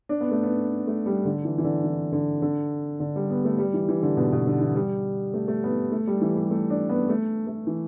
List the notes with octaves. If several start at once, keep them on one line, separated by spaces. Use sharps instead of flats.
D4
B3
A3
B3
A3
G3
D3
E3
E3
D3
E3
D3
D3
D3
G3
B3
A3
G3
E3
E3
D3
B2
B2
D3
E3
G3
A3
A3
B3
A3
G3
E3
G3
A3
D4
B3
A3
A3
E3